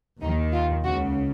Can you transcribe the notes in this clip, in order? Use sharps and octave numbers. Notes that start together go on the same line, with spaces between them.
D#2 D#3 D#4
F4
C#2 C#3 F#4